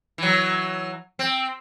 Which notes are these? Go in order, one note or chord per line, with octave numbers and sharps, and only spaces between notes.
E3 F#3
C4